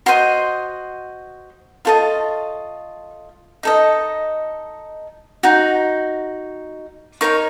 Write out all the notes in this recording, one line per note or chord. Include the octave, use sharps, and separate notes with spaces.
F#4 C5 D#5 C6
F4 A4 D#5 C#6
D#4 A4 D#5
D#4 F#4
D#4 A#4 C#5 C#6